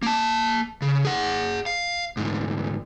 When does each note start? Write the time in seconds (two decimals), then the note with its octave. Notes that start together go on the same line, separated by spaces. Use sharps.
0.02 A#3 A5
0.82 C#3
1.05 G#4 F#5
1.66 F5
2.17 D2 G#2